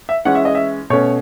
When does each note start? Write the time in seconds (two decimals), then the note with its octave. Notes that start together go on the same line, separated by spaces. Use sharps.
0.09 E5
0.25 E3 G#3 C#4 F#5
0.35 E5
0.45 D#5
0.55 E5
0.90 B2 A3 C#4 C#5